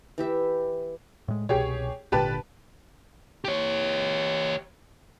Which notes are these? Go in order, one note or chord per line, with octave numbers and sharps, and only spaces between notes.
E3 G4 E5
A2 G#3
C2 B2 G4 G#4 C#5
G#1 A#2 D3 G4 B4 A5
G4 C#5